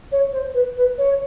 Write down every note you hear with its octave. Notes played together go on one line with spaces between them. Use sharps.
C#5
C5
B4
B4
C#5